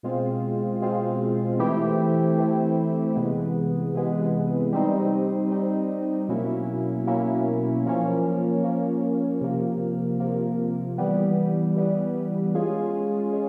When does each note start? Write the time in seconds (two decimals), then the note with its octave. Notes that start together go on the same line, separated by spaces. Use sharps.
0.03 B2 G#3 C4 F4
0.82 B2 G#3 C4 F4
1.59 E3 A3 C4 E4 G4
2.38 E3 A3 C4 E4 G4
3.16 C3 E3 G#3 B3
3.94 C3 E3 G#3 B3
4.72 G3 C4 D#4
5.51 G3 C4 D#4
6.29 B2 F#3 A#3 C#4 E4
7.07 B2 F#3 A#3 C#4 E4
7.86 F3 A#3 C#4
8.63 F3 A#3 C#4
9.41 C3 F3 A#3
10.20 C3 F3 A#3
10.98 E3 G3 B3
11.76 E3 G3 B3
12.54 G#3 C#4 F4 G#4
13.32 G#3 C#4